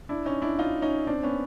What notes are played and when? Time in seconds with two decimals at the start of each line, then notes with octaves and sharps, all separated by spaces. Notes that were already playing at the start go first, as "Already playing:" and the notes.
0.09 D4 E4
0.26 C#4 D#4
0.42 D4 E4
0.59 D#4 F4
0.82 C#4 D#4
1.07 C4 D4
1.23 B3 C#4